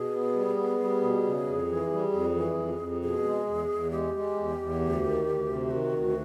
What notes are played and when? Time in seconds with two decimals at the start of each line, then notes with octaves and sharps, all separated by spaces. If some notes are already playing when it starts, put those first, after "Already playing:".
Already playing: B2 G#4
0.12 B3
0.34 G3
0.56 B3
0.79 G3
1.01 B2
1.24 C#3
1.46 F2
1.68 E3
1.90 G3
2.12 F2
2.35 E3
2.57 F2
2.79 F2
3.02 B2 G#4
3.24 G#3
3.47 E2
3.69 E2
3.91 G#3 G4
4.14 G#3
4.36 E2
4.58 E2
4.80 D2
5.03 D#3
5.25 D2
5.48 C3
5.70 D#3 F#4
5.93 D2